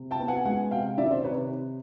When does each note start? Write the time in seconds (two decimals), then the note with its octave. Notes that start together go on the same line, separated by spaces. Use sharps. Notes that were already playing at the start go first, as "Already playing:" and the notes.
Already playing: C3
0.11 G5 A5
0.20 B3
0.28 F#5 G#5
0.45 G#3 F#5 G#5
0.71 C3 F5 G5
0.98 D#3 D5 E5
1.11 C5 D5
1.24 C3 B4 C#5